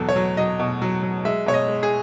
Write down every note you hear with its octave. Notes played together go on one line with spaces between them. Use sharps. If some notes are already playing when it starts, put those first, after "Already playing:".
Already playing: E2 B2 F#3 A4
C#5
F#3
F#3 D#5
B2
F#3
F#3
G#3 E5
B2 C#5
D#5
G#3
G#4